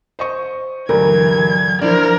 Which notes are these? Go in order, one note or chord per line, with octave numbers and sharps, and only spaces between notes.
C5 D#5 C#6
D2 G2 E3 F#3 A#4 G#6
F3 D4 E4 A#4 C5 D5